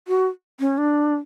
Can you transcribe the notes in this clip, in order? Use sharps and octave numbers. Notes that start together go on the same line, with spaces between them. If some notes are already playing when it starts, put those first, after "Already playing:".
F#4
C#4
D4